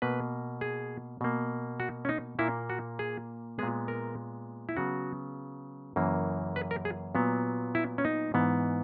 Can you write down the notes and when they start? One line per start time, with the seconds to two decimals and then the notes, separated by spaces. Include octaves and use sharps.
0.02 B2 A#3 B4
0.61 G#4
1.21 B2 A#3
1.80 F#4
2.05 C#4
2.09 D#4
2.39 A#2 A#3 E4
2.70 F#4
2.99 G#4
3.59 A#2 G#3 B3 G#4
3.88 A#4
4.69 E4
4.77 C#3 F#3 B3 F#4
5.96 F#2 C#3 E3 A#3
6.56 B4
6.71 A#4
6.85 G#4
7.15 A#2 F#3 B3
7.75 E4
7.98 C#4
8.05 D#4
8.34 G#2 E3 B3